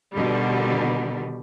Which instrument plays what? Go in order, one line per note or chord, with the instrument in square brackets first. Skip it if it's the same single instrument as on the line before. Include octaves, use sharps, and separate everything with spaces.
[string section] B2 D3 D#3 G3